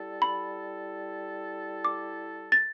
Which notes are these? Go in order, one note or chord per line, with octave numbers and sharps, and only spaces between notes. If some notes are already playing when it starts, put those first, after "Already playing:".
Already playing: G3 E4 A4
B5
D6
A6